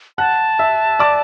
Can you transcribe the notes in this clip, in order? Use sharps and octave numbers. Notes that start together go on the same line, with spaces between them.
F#5 A5 F#6
E5 E6
D5 D6